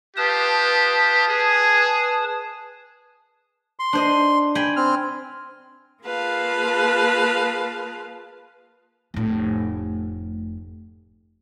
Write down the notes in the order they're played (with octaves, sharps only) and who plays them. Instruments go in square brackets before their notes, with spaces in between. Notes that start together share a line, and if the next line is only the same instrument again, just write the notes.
[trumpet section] F4 G4 [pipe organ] B4 A5 D#6
[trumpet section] G#4
[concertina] C6
[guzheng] D4 C5 D#5
G5 G#5 B5
[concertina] C4 F6
[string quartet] A#3 F4 G#4 B4 F5 A5
[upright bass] F1 A2